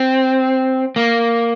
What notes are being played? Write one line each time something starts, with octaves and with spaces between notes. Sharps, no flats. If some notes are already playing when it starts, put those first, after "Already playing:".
Already playing: C4
A#3